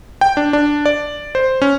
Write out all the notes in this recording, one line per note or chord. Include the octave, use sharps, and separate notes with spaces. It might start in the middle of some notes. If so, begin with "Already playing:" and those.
G5
D4
D4
D5
C5
C#4